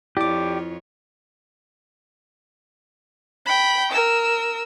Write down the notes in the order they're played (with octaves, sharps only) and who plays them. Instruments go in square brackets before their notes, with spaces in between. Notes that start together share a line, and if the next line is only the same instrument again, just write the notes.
[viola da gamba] F2 F4 C#5 [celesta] E4 [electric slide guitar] G4 [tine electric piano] D5 D6
[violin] G5 B5
A#4 E6